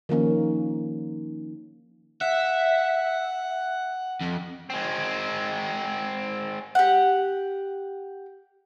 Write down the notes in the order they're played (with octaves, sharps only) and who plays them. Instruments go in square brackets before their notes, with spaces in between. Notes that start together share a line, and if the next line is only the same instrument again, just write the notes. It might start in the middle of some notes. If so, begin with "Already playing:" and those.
[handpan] D#3 F3 A#3 C#4
[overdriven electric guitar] E5 [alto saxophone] F#5
[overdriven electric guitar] F2
G#3 C4
[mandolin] G4 F#5